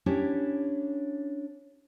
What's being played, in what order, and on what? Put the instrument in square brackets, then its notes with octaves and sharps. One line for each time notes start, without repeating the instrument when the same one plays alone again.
[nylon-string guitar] C#4 D4 E4 G4 C#5